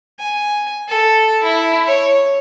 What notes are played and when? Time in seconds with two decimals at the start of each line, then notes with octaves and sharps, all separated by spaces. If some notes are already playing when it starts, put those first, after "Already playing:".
0.19 G#5
0.88 A4
1.43 E4
1.87 C#5